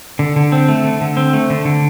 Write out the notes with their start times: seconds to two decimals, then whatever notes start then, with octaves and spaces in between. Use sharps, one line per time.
0.19 D3
0.36 D3
0.52 C4
0.69 A3
0.84 D3
1.01 D3
1.17 C4
1.33 A3
1.50 D3
1.65 D3